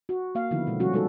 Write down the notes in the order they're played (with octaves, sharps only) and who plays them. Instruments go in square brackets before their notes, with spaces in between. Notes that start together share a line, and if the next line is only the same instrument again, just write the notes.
[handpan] F#4
A#3 F5
D3 D#3 F3 B3 E4
B2 G#3
C3 F3 G3 C#4 F#4
G3 G#3 D#4 F#4 A4